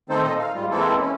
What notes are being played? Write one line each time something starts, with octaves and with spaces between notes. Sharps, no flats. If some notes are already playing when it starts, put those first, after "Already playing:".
D#3 A3 C4 D#4 A4 C5
A#2 D#4 A4 D#5
F5
G#2 G3 F4
E3 G#3 A#3 C4 E4 A4
C#4